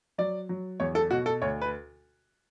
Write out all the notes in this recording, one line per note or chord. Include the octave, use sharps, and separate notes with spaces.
F#3 D5
F#3
E2 C#5
A4
B2 F#4
A4
D2 C#5
B4